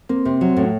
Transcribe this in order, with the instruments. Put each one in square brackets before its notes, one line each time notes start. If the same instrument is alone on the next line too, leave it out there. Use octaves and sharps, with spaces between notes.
[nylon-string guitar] A#3 [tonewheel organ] C4
[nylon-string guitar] C3
F#3
A2